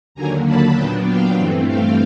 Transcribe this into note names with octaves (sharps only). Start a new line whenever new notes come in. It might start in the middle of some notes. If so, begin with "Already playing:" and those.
D#2 D3 F#3 A#3 G#5 A#5
A5 B5
A#2 F#3 B3 D4 G5 A5
F5 G5
G2 E3 A3 C4
F5 G5